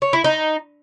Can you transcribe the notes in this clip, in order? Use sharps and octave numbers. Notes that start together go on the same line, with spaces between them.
C#5
E4
D#4